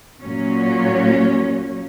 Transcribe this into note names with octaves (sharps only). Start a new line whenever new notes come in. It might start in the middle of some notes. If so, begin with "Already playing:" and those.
A#2 F#3 C#4